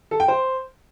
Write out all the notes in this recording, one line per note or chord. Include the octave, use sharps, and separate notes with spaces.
A4
G5
C5